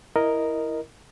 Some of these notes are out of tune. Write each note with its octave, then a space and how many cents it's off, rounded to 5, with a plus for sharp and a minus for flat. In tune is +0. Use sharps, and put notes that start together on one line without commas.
E4 +0 A#4 +0 D#5 +0